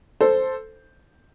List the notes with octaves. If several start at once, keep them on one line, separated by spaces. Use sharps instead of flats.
A4 C5